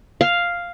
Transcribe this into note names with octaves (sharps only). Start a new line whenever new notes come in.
F5